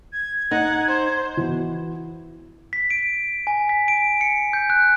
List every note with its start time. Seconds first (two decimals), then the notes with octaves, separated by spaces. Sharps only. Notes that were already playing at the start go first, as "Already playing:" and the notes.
0.13 G#6
0.51 D#4 F#5
0.88 C5
1.37 E3 B3 F#4
2.73 B6
2.90 D7
3.47 G#5
3.69 B6
3.88 D7
4.21 C#7
4.53 G6
4.70 F#6